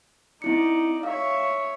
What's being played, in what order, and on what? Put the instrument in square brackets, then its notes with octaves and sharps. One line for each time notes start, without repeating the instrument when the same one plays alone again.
[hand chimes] C4 E4 C#7 [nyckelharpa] D#4 D5
[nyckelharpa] C#5 E5 [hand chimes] F5